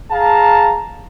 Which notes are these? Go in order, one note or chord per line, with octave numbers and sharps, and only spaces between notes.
G#4 F5 A5 A#5